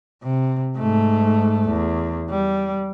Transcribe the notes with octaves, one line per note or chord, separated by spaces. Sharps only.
C3
G#2 A3
E2
G3